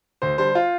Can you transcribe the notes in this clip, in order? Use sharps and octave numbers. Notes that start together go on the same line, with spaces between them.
D2 C5
D3 G3 C5
F4